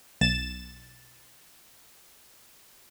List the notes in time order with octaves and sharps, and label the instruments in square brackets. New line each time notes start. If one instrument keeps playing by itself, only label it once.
[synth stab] B1 A6 E7